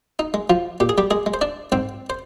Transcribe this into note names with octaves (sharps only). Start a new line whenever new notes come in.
D#4
G#3
F3 F4
A#2 G4
G#4
G3 G4
G#3 G#4
G#3
C5
D4 D5
G#2 C4 C5
C5